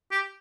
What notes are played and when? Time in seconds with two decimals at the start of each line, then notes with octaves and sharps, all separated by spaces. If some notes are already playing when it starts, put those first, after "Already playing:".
0.11 G4